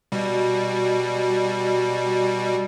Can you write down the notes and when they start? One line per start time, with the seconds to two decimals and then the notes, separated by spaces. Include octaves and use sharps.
0.12 B2 G3